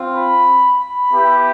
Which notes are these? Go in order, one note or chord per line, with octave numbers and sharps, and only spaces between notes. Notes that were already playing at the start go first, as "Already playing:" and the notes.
Already playing: C4 F4
B5
B5
B3 E4 G4